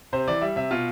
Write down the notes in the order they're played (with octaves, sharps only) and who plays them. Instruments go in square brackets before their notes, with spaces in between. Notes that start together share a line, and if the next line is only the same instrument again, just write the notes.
[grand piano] C3 C5
E3 D5
G3 E5
C3 E5
B2 F4